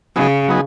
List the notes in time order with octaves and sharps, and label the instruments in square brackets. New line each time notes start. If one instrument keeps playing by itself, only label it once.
[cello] C#3 [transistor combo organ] F#3 B3 D#4 G#4
[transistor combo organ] F#3 B3 D#4 G#4